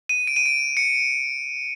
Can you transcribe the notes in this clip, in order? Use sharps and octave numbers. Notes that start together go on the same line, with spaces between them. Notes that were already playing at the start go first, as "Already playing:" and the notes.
D#7
D7
D#7
D7
C#7